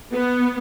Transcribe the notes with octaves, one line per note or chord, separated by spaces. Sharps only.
B3